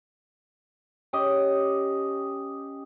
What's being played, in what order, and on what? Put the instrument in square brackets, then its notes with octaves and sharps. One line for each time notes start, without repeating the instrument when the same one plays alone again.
[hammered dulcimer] C#4 G4 D#5